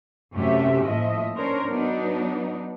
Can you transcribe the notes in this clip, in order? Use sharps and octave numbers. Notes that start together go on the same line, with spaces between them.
F#2 C3 A3 C#4 G4 E5
A2 F3 A#3 D#5 E5
C#4 D4 A#4 C5 C#5
F#3 B3 D4 D#4